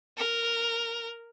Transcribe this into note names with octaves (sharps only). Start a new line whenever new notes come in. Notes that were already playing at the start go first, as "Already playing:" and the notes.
A#4